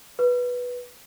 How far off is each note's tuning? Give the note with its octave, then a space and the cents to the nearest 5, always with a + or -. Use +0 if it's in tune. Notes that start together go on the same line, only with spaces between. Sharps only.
B4 -10